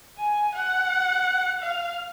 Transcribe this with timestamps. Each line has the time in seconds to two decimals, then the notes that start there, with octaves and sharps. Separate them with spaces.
0.18 G#5
0.54 F#5
1.60 F5